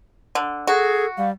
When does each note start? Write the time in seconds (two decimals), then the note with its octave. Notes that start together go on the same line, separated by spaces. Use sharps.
0.35 D3
0.67 F#4 G#4 A4
1.17 G3 F5